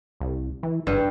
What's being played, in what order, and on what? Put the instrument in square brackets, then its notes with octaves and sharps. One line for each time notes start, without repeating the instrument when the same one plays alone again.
[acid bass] C2
E3
[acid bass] F#1 [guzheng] G2